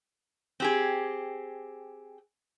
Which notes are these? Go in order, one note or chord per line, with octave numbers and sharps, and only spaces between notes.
C4 G4 G#4